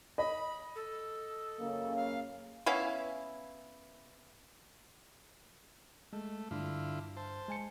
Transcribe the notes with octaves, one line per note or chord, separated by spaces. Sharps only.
D#5 B5
A4
F#2 C#3 A#3
F5
B3 C#4 E4 F5
G#3 A3
G2 D3 E4 F4
C5 A5
G#3 G#5 C#7